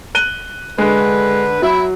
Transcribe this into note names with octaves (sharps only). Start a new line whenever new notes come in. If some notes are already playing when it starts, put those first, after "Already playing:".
F#6 D#7 G7
D3 G#3 B4
F#3 E4